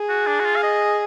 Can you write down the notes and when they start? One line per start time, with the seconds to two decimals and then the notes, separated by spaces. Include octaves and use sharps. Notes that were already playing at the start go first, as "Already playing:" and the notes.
Already playing: G#4
0.09 F#4
0.27 D4
0.40 F#4
0.45 F4
0.56 F5
0.63 D#5